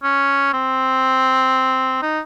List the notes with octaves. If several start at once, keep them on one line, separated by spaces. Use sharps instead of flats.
C#4
C4
D#4